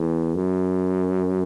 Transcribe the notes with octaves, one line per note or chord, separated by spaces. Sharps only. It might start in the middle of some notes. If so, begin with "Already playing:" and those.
Already playing: E2
F#2